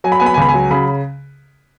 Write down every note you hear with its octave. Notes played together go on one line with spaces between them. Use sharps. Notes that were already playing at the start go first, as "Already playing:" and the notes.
F#3 G#5
B5
B3 G#5
B5
G#5
C#2 B5
G#5
F#3
C#3 B5